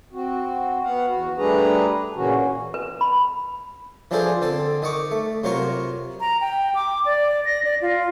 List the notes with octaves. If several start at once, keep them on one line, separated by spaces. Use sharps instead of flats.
C4 F#4
B3 F5 F#5
E2 F#4
G3 A3 D4 G#4 B4 A#5
A#2 C#3 E3 A#3 C#4 F#4
B4
B5
E3 F3 D4 G#4 A4 C5
D3 C4 A4
D#3 D#5 C#6 D6
A3
C3 F#3 F4 A#4 C#6
A#5
G5
D6
D5
A#6
D5
F4